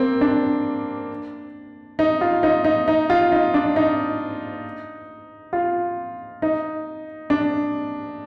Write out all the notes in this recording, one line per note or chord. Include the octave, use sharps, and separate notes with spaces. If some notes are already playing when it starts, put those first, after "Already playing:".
Already playing: A#3 C4
D4
D#4
F4
D#4
D#4
D#4
F4
D#4
D4
D#4
F4
D#4
D4